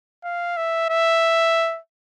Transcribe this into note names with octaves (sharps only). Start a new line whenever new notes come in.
F5
E5
E5